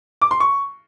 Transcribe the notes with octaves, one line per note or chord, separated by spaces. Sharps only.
D6
C6
C#6